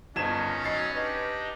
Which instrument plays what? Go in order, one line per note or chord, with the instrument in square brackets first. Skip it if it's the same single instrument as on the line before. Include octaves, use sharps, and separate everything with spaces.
[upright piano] G1 G#6 E7 [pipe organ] D#3 D#4 [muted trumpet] C#4 [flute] A5
[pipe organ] F#3 B3 D#4 [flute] D#5 [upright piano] A6 C7
[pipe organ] D4 D#4 G4 [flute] B4